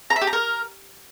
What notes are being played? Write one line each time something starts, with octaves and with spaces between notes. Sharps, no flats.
A#5
E5
G4
A#5
A#4